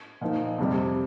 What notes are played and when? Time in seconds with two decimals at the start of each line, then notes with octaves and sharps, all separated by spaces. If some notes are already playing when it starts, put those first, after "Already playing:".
0.21 A#2 F3 A#3 D#4
0.58 F2 C3 G3